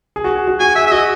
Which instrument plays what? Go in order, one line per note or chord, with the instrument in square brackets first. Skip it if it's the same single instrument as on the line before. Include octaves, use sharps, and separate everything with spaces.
[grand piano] G#4
F#4
G#4
F#4
[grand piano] F#4 [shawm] G#5
[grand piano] G#4 [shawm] E5
[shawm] E5
[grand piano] F#4 [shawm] D#5